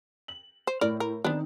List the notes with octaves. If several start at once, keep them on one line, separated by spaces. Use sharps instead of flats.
F#7
C5
A2 A#4 D5
A#4
D#3 B3 C4 D4 D#4